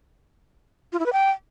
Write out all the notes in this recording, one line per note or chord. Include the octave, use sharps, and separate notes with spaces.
F4
E4
B4
G5